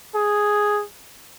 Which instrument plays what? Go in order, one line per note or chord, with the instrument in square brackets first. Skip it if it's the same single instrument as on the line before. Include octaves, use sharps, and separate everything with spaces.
[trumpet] G#4